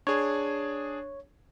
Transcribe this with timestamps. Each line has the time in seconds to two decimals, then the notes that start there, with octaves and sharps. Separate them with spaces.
0.07 D4 G#4 C#5